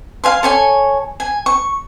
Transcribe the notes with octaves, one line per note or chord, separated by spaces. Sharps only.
F5 G#5 C6
A4 C#5 G#5
G#5
C#6